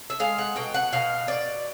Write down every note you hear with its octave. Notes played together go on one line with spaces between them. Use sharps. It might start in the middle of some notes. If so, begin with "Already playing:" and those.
E5
G#3 F5
F#5
B2 G5
F#5
B2 F5
B2 D5